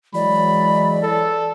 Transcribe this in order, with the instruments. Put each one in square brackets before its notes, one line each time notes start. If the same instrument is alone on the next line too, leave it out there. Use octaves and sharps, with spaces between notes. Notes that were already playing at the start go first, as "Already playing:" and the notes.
[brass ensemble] E3 F#3 G#3 [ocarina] D5 [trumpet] B5
[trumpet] A4